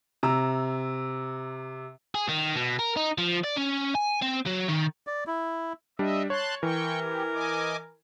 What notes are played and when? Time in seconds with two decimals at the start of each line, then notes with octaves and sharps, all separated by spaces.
0.23 C3 A#5 E6
2.15 G#4
2.29 D#3
2.56 B2
2.79 A#4
2.97 D#4
3.18 F3
3.44 D5
3.56 C#4
3.95 G#5
4.22 C4
4.47 F#3
4.69 D#3
5.07 D5
5.27 E4
5.99 G3 D4 D#5 E5
6.30 C#5 A5 C6 F#6
6.63 E3 A#4 G5 C#6
7.00 G4
7.34 D#5 G#5 D6